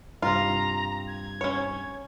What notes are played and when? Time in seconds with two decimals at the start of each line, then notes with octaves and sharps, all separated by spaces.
0.22 G2 C3 F4 A#5
1.07 G#6
1.41 C#4 C#5